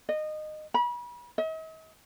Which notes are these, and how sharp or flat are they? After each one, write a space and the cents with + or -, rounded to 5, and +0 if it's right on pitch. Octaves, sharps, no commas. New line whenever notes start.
D#5 -20
B5 -35
D#5 +45